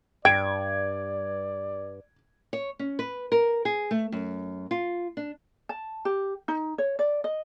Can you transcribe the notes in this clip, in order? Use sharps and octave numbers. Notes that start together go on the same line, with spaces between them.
G2 D5 G5 G#6 D7
C#5
C#4
B4
A#4
G#4
A3
F#2
F4
D4
A5
G4
D#4
C#5
D5
D#5